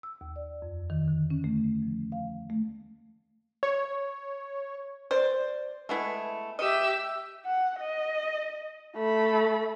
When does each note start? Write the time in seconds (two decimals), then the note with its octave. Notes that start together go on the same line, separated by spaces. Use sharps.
0.03 E6
0.21 D#2
0.36 D5
0.62 F2
0.90 D#3
1.08 D3
1.30 C#4
1.44 A3
1.82 F3
2.12 F5
2.50 A3
3.63 C#5
5.11 C5 D5
5.89 G#3 A3 B3 E4
6.59 G4 D#5 E5 E6
7.46 F#5
7.80 D#5
8.96 A3 B5